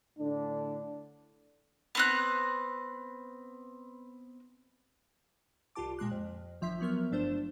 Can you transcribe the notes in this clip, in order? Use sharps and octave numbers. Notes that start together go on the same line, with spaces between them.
A2 D3 D4
B3 C4 F#6
C2 F4 G4 A5 D6
A#2 G#3 C6 F#6
F2
G1 F3 E5 C6 B6
F3 F#3 B3 A#4 F6
G1 G2 A3 D4 C5 E7